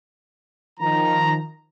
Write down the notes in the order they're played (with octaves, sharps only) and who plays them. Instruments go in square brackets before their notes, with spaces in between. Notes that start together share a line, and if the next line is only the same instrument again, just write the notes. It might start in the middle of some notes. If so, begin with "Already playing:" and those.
[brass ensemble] D#3 F3 A#5